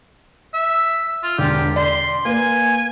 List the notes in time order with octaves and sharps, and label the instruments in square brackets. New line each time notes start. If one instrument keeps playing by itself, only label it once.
[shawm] E5
F4
[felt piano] E1 D3 [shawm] G4
[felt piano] D5 [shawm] C6
[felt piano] A#3 B4 [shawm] G#5